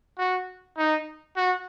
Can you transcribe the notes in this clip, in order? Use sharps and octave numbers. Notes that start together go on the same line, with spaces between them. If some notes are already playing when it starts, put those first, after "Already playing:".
F#4
D#4
F#4